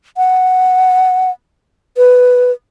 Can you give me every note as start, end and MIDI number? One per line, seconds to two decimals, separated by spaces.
0.17 1.31 78
1.97 2.51 71